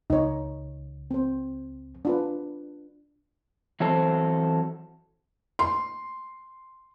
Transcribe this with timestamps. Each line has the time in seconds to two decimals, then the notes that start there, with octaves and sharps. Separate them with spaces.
0.10 C#2 D#4 C#5
1.11 C4 C5
2.05 D4 F4 B4
3.80 E3 F#3 C4 A4 C5
5.59 C6